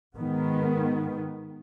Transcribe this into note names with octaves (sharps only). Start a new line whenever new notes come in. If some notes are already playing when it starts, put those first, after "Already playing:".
G#2 D#3 B3